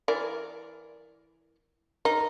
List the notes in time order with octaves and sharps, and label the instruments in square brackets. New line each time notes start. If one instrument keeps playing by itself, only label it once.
[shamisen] E3 A#4 D5
[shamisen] D#4 [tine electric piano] A#4